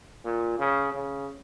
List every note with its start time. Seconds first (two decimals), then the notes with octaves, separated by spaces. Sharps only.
0.24 A#2
0.58 C#3
0.92 C#3